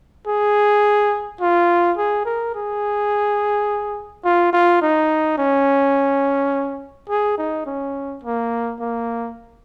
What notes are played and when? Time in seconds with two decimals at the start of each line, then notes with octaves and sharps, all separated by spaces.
0.27 G#4
1.41 F4
1.97 G#4
2.25 A#4
2.55 G#4
4.25 F4
4.53 F4
4.82 D#4
5.38 C#4
7.10 G#4
7.38 D#4
7.66 C#4
8.23 A#3
8.80 A#3